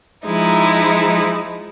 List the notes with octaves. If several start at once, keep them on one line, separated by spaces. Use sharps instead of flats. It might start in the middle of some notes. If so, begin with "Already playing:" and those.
F3 G#3 D#4 E4